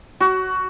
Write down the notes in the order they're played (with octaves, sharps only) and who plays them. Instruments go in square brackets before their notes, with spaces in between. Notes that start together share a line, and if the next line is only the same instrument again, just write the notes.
[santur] F#4